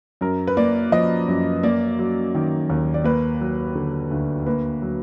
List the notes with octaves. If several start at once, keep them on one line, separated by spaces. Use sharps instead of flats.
F#2 A#4
B4
A#3 D5
F3 D#5
F#2
A#3 D5
F#3
D#3
D#2
D5
A#3 B4
F#3
D3
D2
A#3 B4
F#3